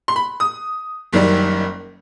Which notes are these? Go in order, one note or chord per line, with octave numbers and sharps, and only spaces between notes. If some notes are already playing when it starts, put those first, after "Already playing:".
C6
B5
D#6
F#1 F#2 D#3 G3